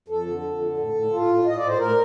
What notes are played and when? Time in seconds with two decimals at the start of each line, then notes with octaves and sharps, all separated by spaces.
0.08 F2 A4
0.26 D3
0.43 F2
0.59 D3
0.77 A2
0.94 A2
1.11 A2 F4
1.27 A2
1.44 A2 D#5
1.57 A2 D5
1.67 C5
1.78 A2 A#4